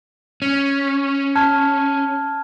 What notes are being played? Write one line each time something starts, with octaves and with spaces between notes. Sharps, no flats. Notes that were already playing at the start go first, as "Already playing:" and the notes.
C#4
A5 F6 G#6